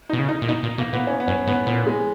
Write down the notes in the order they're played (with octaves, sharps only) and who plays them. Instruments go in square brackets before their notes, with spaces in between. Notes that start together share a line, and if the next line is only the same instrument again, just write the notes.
[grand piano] D#4
[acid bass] B2
C#3
[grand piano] D#4
[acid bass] A#2
[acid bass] B2 [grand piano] D#4
[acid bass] A#2
[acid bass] B2 [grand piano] A#3
[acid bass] A#2 [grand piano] B3
[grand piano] C#4
B3
[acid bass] F#2 [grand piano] C#4
[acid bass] G#2 [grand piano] B3
[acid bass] A#2 [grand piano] B3
[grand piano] G#3